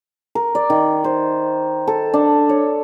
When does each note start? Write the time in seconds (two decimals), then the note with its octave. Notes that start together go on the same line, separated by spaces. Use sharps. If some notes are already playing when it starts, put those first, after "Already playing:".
0.35 A#4
0.55 D5
0.70 D#3
1.04 C5
1.87 A4
2.14 D4
2.49 C#5